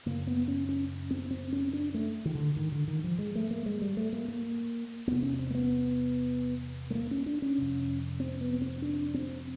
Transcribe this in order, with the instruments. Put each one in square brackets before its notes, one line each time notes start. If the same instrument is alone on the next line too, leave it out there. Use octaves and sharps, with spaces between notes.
[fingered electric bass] F#2 C#3 A#3
B3
C#4
C#4
C4
C4
C#4
D4
A3
D#3
D3
G#2 D#3
D3
D#3
F3
G#3
A3
A#3
G#3
G3
A3
A#3
A#3
E2 C3 B3
C#4
C4
A#3
B3
A3
A#3
C#4
D4
C#4
F2 C3
C4
B3
C4
D4
C4